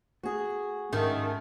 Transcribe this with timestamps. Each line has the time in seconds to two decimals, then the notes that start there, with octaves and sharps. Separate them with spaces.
0.23 A3 F#4 G#4
0.93 G#2 D#3 G#3 A3 C#4